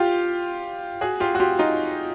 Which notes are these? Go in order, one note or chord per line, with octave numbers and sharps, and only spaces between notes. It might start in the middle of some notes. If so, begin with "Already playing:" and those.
Already playing: F4 G4
F#4 G#4
F4 G4
F#4
F4 G4
D#4 F4